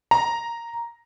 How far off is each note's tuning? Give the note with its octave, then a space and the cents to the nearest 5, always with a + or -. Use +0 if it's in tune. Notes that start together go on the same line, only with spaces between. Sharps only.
A#5 +0